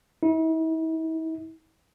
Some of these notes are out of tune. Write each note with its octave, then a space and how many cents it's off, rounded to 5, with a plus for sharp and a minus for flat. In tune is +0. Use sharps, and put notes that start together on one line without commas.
E4 -45